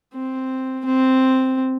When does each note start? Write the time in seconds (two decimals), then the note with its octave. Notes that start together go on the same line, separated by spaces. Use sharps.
0.14 C4
0.85 C4